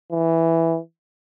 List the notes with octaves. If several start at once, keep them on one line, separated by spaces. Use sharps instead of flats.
E3